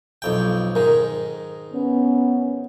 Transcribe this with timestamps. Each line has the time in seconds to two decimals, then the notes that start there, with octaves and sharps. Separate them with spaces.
0.22 B1 F2 G5
0.75 G#2 D#3 A#4
1.74 B3 C#4